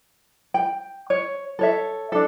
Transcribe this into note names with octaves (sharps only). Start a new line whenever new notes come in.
G5
C#5
A4 C#5 E5
D4 A4